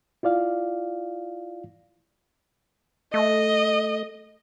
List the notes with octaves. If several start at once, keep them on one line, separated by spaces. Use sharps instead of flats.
E4 F4 D5 F5
A3 D#5